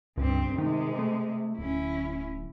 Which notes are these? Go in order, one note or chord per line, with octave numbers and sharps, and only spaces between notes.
C#2 G2 C4
C3 D#3 G#3
A3
D1 C#4 E4